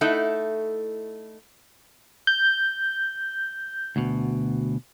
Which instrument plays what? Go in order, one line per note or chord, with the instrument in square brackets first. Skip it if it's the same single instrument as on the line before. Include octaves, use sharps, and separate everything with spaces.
[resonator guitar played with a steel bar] A3 D#4 E4 A4 F#5
[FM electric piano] G6
[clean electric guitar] D2 B2